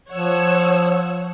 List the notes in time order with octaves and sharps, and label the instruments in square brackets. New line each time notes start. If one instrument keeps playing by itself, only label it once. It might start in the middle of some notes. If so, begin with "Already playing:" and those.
[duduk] F3 [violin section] C#5 F#5 E6